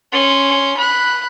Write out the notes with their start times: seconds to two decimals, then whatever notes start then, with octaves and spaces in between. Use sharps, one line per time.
0.12 C#4 C6
0.77 B5 F#6